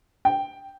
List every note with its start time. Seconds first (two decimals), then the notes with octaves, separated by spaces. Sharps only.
0.25 G5